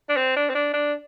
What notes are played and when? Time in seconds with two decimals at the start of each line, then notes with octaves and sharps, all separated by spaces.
0.10 D4
0.17 C4
0.36 D4
0.50 C4
0.55 D4
0.74 D4